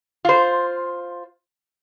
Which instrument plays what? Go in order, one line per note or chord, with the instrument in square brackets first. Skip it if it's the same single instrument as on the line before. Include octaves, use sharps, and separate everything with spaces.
[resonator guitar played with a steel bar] F4 C5